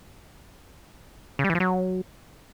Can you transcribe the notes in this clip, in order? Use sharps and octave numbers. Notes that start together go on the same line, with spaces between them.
C#3
G3
E3
F3
F#3